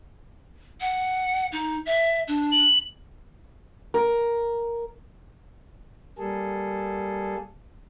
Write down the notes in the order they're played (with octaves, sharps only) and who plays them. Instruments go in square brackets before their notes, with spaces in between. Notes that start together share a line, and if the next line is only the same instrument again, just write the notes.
[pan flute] F#5
D#4
E5
D4
[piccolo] F#7
[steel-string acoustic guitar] A#4
[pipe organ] G3 A#3 G#4 A4